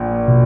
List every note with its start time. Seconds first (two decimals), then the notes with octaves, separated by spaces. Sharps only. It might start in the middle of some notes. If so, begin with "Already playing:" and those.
Already playing: A#1 A#2 A#3
0.28 B2